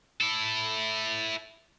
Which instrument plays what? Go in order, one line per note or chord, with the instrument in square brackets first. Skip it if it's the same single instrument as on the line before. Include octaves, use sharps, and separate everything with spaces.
[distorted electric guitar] E4 A4